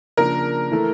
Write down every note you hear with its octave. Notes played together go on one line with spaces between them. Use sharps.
C#3 F3 A#3 D4 A#4
E3 A3 E4 A4